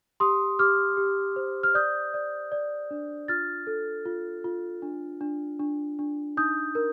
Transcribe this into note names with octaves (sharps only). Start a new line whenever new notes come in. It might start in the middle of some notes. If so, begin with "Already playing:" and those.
G4 C6 D#6
G4 D6 F6
G4
C5
F6
D5 D#6 G6
D5
D5
D4
F4 F6 A6
A4
F4
F4
D4
D4
D4
D4
D#4 D#6 G6
A#4